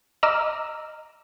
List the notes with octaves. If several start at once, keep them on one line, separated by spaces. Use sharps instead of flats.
D#5 A#5 D6 E6 F6